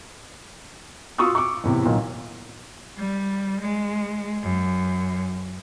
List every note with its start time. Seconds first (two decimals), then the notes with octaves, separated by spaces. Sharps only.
1.18 F4 F#4 C#6 D#6 E6
1.35 C#6 D6
1.64 E2 A2 C3
1.85 B1 A#2 D#3
2.98 G3
3.61 G#3
4.42 F#2